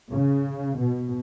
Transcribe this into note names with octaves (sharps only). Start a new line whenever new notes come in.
C#3
B2